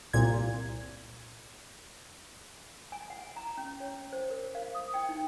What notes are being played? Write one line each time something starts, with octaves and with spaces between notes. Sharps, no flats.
C2 A#2 G#6
G#5
F#5
A#5
C#4
C#5
C5
A#4
F5
D#6
G5
D#4